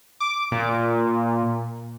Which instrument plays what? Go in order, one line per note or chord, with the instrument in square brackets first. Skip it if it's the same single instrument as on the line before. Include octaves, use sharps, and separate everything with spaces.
[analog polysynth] D6
A#2